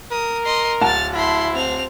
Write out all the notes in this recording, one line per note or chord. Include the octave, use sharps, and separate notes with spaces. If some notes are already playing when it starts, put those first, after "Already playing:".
A#4 D#6
D#5 C6
D1 F#5 A5 F6 A6
E4 B5 C6
C4 F7